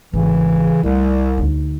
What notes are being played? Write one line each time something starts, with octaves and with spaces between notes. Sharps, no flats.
G#1 C#3 E3
C2 G3 A3
D2 D#4